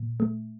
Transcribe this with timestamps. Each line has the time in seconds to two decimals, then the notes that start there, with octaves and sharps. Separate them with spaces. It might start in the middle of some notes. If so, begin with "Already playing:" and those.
Already playing: A#2
0.20 A3